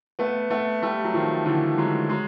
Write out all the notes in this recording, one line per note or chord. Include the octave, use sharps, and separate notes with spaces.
A3 B3
A3 B3
G3 A3
F#3
D#3 F3
D3 E3
F#3 G#3
F#3 G#3